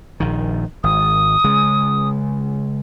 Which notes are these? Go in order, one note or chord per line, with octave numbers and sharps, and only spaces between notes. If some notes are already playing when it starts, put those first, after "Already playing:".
A#1 D#3
G#1 D#6
C#3 G#3